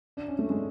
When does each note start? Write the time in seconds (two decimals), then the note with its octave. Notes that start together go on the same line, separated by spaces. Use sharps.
0.17 D4
0.28 C#4
0.39 A3
0.50 G#3